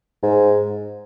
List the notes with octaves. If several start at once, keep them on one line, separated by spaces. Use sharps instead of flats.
G#2